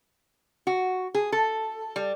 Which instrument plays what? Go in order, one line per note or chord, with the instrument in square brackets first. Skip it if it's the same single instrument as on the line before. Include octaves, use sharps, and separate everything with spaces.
[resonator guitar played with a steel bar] F#4
G#4
A4
G3